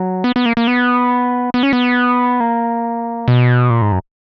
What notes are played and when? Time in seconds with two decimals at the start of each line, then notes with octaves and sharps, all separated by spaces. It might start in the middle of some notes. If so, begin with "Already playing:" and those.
Already playing: F#3
0.24 B3
0.36 B3
0.46 A#3
0.57 A#3
0.67 B3
1.54 B3
1.63 C#4
1.73 B3
2.40 A#3
3.28 B2
3.70 A#2
3.82 G#2
3.92 F#2